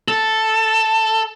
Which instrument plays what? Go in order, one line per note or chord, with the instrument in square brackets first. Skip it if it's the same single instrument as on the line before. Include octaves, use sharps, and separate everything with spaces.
[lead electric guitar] A4